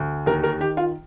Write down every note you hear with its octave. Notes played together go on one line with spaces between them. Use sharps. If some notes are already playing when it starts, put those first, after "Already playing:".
Already playing: D2
D#2 A#4
A#4
D#3 G4
F4